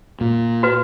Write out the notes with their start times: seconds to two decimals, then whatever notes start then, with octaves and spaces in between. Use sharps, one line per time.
0.21 A#2
0.63 F#4 B4